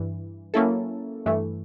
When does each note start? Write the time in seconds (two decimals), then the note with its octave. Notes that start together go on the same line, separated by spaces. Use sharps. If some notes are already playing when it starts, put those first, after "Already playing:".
Already playing: G2 E3
0.54 F#3 A#3 C#4 E4 A4
1.26 G2 E3 A3